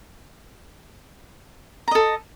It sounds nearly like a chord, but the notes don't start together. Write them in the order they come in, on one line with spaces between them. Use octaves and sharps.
A#5 D#5 A4